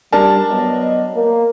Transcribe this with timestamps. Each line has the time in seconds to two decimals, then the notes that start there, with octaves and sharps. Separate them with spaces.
0.12 G3 D4 A#4 A5
0.49 F#3 B3 D#5
1.14 A#3